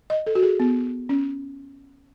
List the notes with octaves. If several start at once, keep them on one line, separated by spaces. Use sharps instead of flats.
D#5
A4
F#4
G#4
B3
C#4